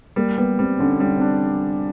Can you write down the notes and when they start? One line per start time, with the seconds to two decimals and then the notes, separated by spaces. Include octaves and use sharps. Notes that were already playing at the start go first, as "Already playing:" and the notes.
0.16 G3 A#3
0.37 G3 B3
0.59 G3 C4
0.79 D3 C#4
1.00 G3 C#4
1.17 C4 D4